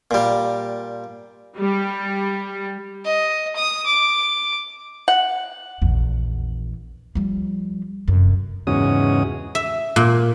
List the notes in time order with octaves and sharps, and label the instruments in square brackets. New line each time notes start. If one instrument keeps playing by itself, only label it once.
[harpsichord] A#2 G3
[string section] G3
[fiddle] D#5
D#6
D6
[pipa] F#5
[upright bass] A#1 E2
F3 G3
F1 F#2
[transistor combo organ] E2 G#2 C#3 C#4 F#4 D#6
[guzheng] E5
A#2